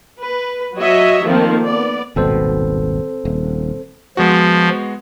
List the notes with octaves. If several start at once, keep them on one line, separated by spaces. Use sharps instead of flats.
B4
F#3 F#4 C#5 D#5 E5
D#3 F3 A3 A#3 C4
B3 D5
D#1 G#1 B2 C4 A4 C5
D#1
F3 G#3 B3 F#4